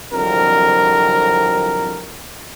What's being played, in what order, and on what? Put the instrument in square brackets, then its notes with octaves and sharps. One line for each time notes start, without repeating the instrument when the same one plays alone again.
[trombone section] C2 F2 D3 F#3 A#4